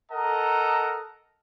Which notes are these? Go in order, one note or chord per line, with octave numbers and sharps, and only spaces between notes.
A4 A#4 D#5 F#5 A#5